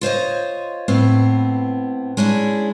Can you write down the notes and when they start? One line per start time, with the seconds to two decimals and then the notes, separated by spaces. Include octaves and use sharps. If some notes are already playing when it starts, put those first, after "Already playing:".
0.01 F4 C5 C#5 D#5
0.88 A2 B3 C4
2.17 G#3 C#4 D4 E4